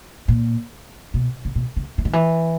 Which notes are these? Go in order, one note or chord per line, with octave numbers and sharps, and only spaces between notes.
A#2
B2
C#3
B2
C#3
E3
D#3
E3